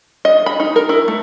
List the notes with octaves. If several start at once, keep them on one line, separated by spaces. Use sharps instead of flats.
D#5
B5
D#4
A#4
E4
A3